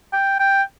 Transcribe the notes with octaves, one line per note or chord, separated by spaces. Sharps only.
G5
G5